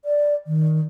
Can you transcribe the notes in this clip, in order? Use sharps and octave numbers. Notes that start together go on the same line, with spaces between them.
D5
D#3